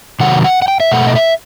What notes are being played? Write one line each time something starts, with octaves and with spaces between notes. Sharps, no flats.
C3 D#3 F#3 F#5
F#5
F#5
G5
E5
B2 A3 F#5
D#5
E5